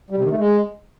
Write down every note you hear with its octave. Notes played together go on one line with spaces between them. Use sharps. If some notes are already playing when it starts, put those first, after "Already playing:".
G3
C3
D#3
A3
G#3